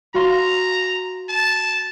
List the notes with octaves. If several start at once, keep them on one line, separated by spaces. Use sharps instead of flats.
F#4 F5 A#5 C6
A5